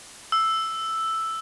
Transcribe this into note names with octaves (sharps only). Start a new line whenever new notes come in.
E6